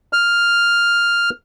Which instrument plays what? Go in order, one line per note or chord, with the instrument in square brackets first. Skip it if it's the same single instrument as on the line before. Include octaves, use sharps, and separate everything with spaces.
[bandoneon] F6